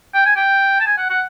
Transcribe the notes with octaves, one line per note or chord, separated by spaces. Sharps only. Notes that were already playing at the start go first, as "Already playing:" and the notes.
G5
G#5
G5
A5
G#5
F#5
F#5